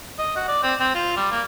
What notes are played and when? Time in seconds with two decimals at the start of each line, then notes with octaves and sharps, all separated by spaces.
0.19 D#5
0.36 F#4
0.48 D5
0.63 C4
0.80 C4
0.95 F4
1.17 G3
1.31 A#3